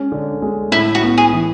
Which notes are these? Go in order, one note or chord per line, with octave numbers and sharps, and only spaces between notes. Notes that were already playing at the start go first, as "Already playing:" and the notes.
Already playing: G#3 C#4
D3
G#3
A2 E4
F#4
B3
G#4
E3